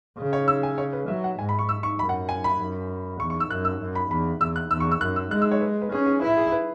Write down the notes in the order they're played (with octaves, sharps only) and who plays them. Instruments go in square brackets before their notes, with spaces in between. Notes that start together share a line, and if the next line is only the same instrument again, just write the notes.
[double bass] C#3
[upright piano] C#5
E6
G#5
C#5
B4
[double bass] F#3 [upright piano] E5
[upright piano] F#5
[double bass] G#2 [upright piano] G#5
[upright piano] B5
C#6
E6
C#6
[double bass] F#2 [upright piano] B5
[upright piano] F#5
G#5
B5
[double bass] F#2
[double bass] E2 [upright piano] C#6
[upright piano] C#6
E6
[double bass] F#2 [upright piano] F#6
[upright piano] E6
[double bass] F#2
[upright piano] B5
[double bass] E2 [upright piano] B5
[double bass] E2 [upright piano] E6
[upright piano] F#6
[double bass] E2 [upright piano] E6
[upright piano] C#6
E6
[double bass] F#2 [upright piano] F#6
[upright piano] E6
[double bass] G#3 [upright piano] F#6
[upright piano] E6
C#5
B4
B4
[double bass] C#4 [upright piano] G#4
[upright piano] G#4
[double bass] E4 [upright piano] B4
[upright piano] G#4
B4